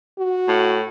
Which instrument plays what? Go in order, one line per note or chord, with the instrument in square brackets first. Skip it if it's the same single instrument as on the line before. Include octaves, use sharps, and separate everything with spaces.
[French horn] F#4
[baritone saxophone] A2